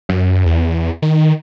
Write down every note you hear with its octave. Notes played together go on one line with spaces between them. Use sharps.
F#2
E2
D#3